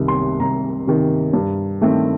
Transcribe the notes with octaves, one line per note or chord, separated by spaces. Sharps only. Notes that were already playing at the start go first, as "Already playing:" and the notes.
Already playing: C2 C3 D#3
C6
C2 A#5
C3 D#3
G2
D#3 A3 C4